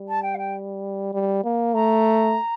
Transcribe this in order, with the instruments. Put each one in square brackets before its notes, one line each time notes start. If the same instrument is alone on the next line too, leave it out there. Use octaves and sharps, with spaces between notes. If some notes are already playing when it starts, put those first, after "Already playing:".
Already playing: [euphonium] G3
[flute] A5
G5
F5
G5
[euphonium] G3
A#3
[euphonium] A3 [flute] A#5